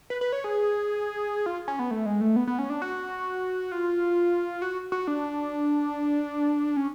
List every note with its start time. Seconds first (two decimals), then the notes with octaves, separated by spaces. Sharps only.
0.10 B4
0.21 B4
0.33 C#5
0.44 G#4
1.46 F4
1.68 C#4
1.79 B3
1.91 A3
2.06 G#3
2.21 A3
2.36 B3
2.47 B3
2.59 C#4
2.70 D4
2.82 F#4
3.72 F4
4.62 F#4
4.92 F#4
5.07 D4
6.77 C#4